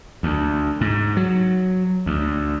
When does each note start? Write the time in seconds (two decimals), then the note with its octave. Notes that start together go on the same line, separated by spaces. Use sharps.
0.23 D2
0.81 G#2
1.17 F#3
2.06 D2